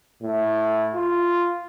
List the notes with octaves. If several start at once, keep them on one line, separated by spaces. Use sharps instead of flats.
A2
F4